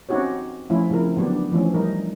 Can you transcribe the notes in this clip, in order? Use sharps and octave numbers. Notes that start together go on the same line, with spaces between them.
C4 C#4 D#4 F#4 G4 C#5
F3 A3 C#4 E4 F4
C#3 F3 C4 E4 A#4
D3 F#3 B3 D4 G4
E3 F3 A3 C#4
G3 D#4 A#4